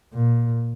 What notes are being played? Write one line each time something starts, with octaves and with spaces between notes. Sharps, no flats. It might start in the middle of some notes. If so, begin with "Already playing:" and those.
A#2